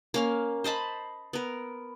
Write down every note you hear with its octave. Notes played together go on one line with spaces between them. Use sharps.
A#3 C#4 F5
C5 D#5 A5 B5
B3 A#4